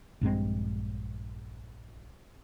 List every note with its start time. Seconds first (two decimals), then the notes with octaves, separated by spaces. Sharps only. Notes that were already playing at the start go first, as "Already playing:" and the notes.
0.21 A#1 G2 G#3 C4